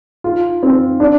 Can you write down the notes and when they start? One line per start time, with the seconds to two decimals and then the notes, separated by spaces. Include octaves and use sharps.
0.24 F4
0.63 C4
1.00 D4